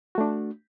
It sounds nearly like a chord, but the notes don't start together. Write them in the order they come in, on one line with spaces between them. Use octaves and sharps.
F#4 A3 D4